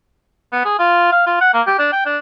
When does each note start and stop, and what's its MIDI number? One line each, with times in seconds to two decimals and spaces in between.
0.52 0.62 59
0.65 0.75 68
0.79 1.10 65
1.12 1.22 77
1.26 1.37 65
1.41 1.52 78
1.53 1.62 58
1.67 1.76 67
1.79 1.88 62
1.93 2.06 79
2.06 2.18 62